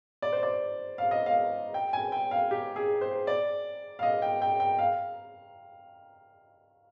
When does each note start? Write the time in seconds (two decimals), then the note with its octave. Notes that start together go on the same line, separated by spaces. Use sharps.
0.22 D5
0.33 C5
0.43 D5
0.98 F5
1.11 D#5
1.26 F5
1.74 G5
1.93 G#5
2.12 G5
2.31 F5
2.51 G4
2.76 G#4
3.01 C5
3.27 D5
3.99 F5
4.03 D#5
4.22 G5
4.42 G5
4.60 G5
4.79 F5